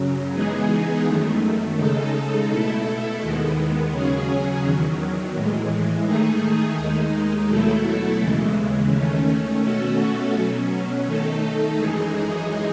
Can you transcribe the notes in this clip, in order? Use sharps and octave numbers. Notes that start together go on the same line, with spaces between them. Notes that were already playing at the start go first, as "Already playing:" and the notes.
Already playing: F#2 C#3 F#3
E3 G#3 B3 D#4 G#4
F#2 D#3 A3
C#3 G#3 D#4 A4
B2 A3 E4 A4
D#2 D#3 G#3 B3
C#3 F#3 C#4 G#4
E2 D#3 F#3
A2 E3 G#3
D#3 A3 D#4 G#4
D#2 D#3 G#3 D#4
B2 F#3 A3 E4 A4
D#2 C#3 E3 G#3
D#3 A3 C#4
B2 A3 C#4 F#4 A4
B2 F#3 C#4
D#3 A3 D#4 A4
F#2 E3 G#3 D#4 G#4